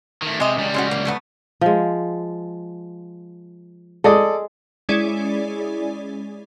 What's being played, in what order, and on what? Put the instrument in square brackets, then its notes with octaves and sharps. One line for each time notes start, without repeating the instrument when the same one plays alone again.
[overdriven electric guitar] D#3 A3
[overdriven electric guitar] C3 [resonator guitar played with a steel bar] G#3 D#5
[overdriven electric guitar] C#2 G3
[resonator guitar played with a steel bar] G#3 C#4 F#4
A#3
F#3 A3 B3
[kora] F3 G#3
[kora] G#3 [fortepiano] A4 D5 D#6
[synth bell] G#3 C#4 E4 G#4 D5